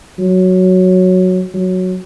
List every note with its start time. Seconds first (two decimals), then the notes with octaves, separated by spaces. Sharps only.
0.19 F#3
1.54 F#3